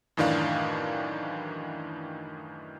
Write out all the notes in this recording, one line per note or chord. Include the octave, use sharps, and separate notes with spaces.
F#2 A2 D#3 E3 D4 F5